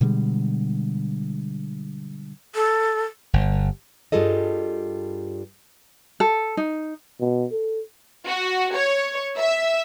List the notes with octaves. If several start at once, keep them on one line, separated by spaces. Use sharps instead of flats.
B2 D3 G3 G#3
A4
G1
G2 G3 F4 G#4 A4 D#5
A4
D#4
B2
A4
F#4
C#5
E5